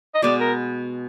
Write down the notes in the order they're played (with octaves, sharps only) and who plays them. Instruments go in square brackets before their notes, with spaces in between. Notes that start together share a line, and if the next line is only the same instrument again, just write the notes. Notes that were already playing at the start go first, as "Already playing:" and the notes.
[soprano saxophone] D#5
[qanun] B2 G#3 B3 [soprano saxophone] D5
[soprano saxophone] A#4